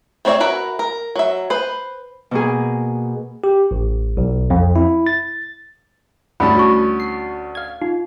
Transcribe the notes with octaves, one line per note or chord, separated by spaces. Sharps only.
A3 C4 C#5 D5 E5
F#4 A#4 B4 E5
A#4
F#3 E5
B4 C5
B2 A#3 G#4
G4
A1
B1
F2
E4
A6
D2 G3 A3 C#4 E4 A5 B5
F#4 C#6
C7
F5 G#6
D#4 F4